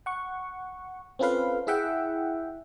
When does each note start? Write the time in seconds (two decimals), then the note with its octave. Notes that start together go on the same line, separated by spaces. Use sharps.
0.06 F#5 C#6
1.19 C4 C#4 F4 A4 B4 F5
1.67 E4 G#4 E5 F#5 G5